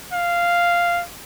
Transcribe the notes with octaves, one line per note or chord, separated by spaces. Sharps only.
F5